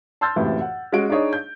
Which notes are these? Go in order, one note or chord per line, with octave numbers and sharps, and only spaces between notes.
A5 C6 E6 F6 G6 A6
C#2 F#2 A2 C3 E3
F#5
G#3 C#4 F#4 D7
D4 D#4 G#4 C#5 D#5
G6